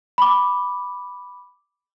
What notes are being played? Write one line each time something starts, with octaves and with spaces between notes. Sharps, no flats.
B5 D6